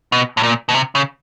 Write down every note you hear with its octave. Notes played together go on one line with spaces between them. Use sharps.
B2
A2
A#2
B2
C3
C#3